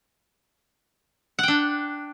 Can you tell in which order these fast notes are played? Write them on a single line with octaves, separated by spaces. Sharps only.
F#5 G5 D4